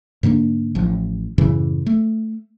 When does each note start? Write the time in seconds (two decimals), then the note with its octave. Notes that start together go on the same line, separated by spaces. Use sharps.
0.23 G#2 D3 A#3 D4
0.75 A1 F3
1.38 F#2 A2 C#3 E3
1.86 A3